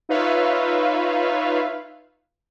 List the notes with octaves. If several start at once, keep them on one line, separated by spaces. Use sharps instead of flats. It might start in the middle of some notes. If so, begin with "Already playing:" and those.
D#4 F4 B4 C#5 E5 F5